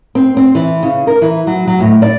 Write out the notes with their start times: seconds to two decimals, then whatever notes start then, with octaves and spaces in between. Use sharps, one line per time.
0.15 C4
0.37 C4
0.55 E3
0.83 C#3
1.07 A#4
1.22 E3
1.47 F#3
1.67 F#3
1.80 A2
2.02 D5